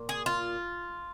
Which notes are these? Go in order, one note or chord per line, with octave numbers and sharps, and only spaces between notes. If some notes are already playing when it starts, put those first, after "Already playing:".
Already playing: A#2
G#4
F4